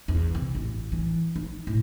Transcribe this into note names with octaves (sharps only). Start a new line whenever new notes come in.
E2
C3
A1
E3
D#4
A2